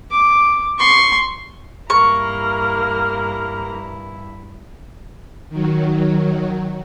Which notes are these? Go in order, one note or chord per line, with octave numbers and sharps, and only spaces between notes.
D6
C6 C#6
G2 A#3 E4 A#5 C#6 F6
D#3 F#3